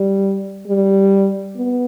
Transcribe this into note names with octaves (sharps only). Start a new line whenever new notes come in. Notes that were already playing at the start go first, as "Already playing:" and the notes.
Already playing: G3
G3
B3